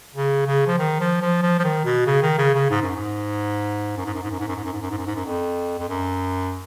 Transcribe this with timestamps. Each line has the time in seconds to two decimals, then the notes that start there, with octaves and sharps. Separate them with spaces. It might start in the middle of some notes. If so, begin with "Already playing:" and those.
0.15 C#3
0.47 C#3
0.67 F3
0.79 D#3
1.00 F3
1.21 F3
1.42 F3
1.59 F3
1.64 D#3
1.85 B2
2.06 C#3
2.22 D#3
2.38 C#3
2.54 C#3
2.70 G#2
2.82 F#2
2.95 G#2
3.97 F#2
4.05 G#2
4.14 F#2
4.23 G#2
4.31 F#2
4.40 G#2
4.48 F#2
4.56 G#2
4.64 F#2
4.73 G#2
4.81 F#2
4.90 G#2
4.98 F#2
5.07 G#2
5.15 F#2
5.26 F2
5.79 F2
5.89 F#2